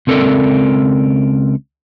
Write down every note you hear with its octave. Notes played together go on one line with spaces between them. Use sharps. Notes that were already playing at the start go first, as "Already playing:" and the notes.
C#2 C4 A4 A#4 D5 E5